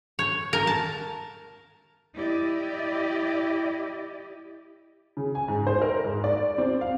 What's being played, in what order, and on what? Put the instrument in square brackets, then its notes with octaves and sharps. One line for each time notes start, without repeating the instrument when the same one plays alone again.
[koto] C#5
A#4
A5
[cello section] E4 G4 D5 D#5
[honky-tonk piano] C#3
G#5
G#2
C5
A#4
G#2
D5
C4
F5